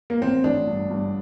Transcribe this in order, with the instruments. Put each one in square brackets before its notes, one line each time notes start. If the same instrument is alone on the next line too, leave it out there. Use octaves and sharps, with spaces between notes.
[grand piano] A#3
[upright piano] A1 [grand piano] C4
[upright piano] A1 [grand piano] D4
[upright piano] G2
G2